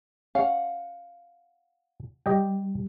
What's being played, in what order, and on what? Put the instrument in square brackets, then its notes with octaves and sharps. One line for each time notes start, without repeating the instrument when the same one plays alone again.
[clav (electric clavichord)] C#4 [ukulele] F5 F#5
[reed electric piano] G3 [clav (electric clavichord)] G4 D#5 G5